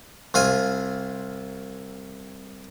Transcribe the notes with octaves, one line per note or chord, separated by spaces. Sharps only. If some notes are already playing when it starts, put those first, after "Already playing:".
C2 F4 G#5